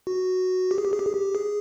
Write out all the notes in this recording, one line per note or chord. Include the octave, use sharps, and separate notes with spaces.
F#4
G4
G#4
G4
G#4
G4
G#4
G4
G#4